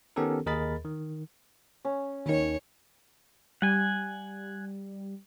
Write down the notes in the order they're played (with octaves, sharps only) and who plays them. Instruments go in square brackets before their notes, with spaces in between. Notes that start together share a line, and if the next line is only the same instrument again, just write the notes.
[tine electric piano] D#3 B3 C#4 G4 A4 A#4
D#2 G#4 A#4 D#5 B5 A6
D#3
[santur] C#4
[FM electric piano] D#2 D#3 [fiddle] C#5
[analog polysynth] G3 [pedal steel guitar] F#5 G#5